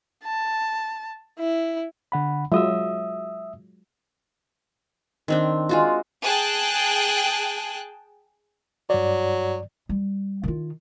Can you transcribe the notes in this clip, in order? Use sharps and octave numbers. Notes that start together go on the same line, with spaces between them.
A5
E4
D3 F#5 B5
F#3 G#3 F4 E5 D#6 E6
D#3 C4 D4
G#3 F4 F#4
G#4 G5 A5 F#6
G2 F#3 D5
G3
D#3 F4